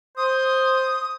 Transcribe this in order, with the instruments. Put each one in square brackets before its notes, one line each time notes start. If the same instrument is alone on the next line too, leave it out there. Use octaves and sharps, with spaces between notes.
[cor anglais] C5 [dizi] D#6